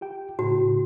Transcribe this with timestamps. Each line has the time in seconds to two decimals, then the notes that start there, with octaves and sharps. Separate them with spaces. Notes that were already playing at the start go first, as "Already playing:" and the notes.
0.01 F4 G4 G5
0.39 A2 C#3 F#4